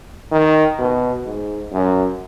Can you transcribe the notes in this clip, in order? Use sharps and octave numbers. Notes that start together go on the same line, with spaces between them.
D#3
B2
G#2
F#2